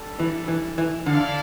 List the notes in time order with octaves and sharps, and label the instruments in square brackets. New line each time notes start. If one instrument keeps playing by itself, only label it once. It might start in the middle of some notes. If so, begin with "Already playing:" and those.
Already playing: [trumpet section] G3 D4 A4
[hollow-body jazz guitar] E3
E3
E3
[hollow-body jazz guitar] D3 [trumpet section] E4 A4 D5 F5